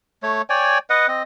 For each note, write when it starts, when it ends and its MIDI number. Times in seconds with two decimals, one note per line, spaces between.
0.23 0.42 57
0.23 0.42 73
0.50 0.78 73
0.50 0.78 74
0.50 0.78 79
0.50 0.78 80
0.90 1.08 71
0.90 1.08 75
0.90 1.08 78
1.08 1.23 60
1.08 1.23 75